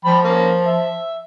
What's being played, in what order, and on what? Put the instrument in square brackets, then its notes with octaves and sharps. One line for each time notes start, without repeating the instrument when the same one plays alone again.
[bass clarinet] F3 [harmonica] G5 B5
[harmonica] A#3 C#4
E5